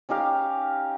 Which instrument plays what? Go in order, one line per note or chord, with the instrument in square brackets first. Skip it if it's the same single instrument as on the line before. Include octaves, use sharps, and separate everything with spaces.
[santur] C#4 D#4 G4 F5